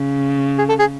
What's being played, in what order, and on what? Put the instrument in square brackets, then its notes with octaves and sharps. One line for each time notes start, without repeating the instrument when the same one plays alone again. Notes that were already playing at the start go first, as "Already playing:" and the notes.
Already playing: [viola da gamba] C#3
[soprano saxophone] G#4
A4
G#4